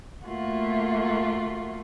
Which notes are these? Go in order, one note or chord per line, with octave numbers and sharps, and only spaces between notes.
A3 A#3 F4 F#4